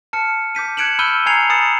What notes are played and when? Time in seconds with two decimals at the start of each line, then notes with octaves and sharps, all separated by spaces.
0.13 A5 F6 C#7
0.55 D6 G6 B6 D#7
0.77 F#6 G#6 C#7 D7 E7 F#7
0.99 B5 E6 F6 G6 D#7 G7
1.26 G#5 A#5 G#6 C7 C#7 F7
1.49 G#5 B5 D#6 A6 C#7 E7